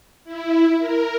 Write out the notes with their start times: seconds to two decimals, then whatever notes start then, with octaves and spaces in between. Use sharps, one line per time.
0.24 E4
0.79 A#4